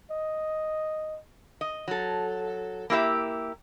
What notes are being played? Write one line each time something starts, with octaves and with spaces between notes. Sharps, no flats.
D#5
D#5
F#3 A4
A#3 E4 G4 E5